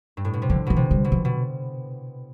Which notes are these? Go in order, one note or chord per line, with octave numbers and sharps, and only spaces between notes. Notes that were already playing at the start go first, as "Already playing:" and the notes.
G2
A2
B2
C3
D3 F3
B2 E3
C3
G3
B2
F3
B2